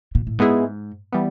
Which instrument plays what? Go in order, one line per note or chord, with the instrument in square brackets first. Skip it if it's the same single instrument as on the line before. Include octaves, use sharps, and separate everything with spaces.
[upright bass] A#2
A2
[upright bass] G#2 [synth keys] G#3 B3 E4 G#4
[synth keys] E3 G3 B3